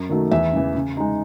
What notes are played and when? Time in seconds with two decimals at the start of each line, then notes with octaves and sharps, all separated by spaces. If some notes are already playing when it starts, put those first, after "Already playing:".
Already playing: F#2
0.09 D#3 F#3 A3
0.31 E2 E5
0.53 C#3 E3
0.75 C#3
0.97 G#3 D#4